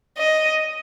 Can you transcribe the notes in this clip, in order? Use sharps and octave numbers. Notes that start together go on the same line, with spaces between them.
D#5